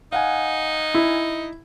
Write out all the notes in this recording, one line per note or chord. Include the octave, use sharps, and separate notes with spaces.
D#4 F5 F#5 G#5
E4